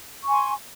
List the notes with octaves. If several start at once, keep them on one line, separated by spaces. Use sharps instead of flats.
G#5 C6 C#6